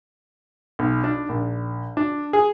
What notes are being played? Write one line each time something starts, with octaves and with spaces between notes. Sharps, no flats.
B1
D4
A#1
D4
G#4